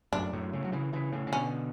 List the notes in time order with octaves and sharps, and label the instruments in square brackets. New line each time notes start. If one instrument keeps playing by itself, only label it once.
[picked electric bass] F#2 A2 [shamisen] D4
[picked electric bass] F#2 A2
A2 C#3
F#3
C#3 E3
C#3 E3
A2 C#3
C#3
[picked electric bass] B2 D3 [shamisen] C#4